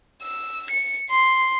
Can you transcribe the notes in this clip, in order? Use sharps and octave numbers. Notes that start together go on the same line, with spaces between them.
E6
C#7
C6